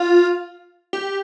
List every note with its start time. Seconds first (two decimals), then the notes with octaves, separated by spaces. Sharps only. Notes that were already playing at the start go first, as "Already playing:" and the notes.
Already playing: F4
0.93 G4